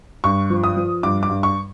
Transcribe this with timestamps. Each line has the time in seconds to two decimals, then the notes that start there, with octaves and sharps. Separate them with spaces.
0.24 G2 C#6
0.50 F3
0.64 D#6
0.77 F3
1.03 G2 D6
1.23 D6
1.29 G2
1.43 C#6